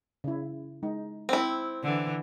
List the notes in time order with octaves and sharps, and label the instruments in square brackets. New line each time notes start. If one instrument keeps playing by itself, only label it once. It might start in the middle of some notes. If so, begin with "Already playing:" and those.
[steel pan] C#3 E4
G#3 D#4
[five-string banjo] C4 E4
[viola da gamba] D3 E3